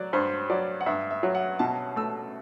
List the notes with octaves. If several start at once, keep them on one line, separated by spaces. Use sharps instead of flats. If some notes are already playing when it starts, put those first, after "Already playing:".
Already playing: F#3 D5
G2 C5
F#3 D5
F#5
G2 E5
E5
F#3
F#5
B2 A5
A3 E6